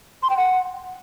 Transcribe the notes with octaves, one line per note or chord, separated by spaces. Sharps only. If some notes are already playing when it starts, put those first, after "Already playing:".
C6
G5
F#5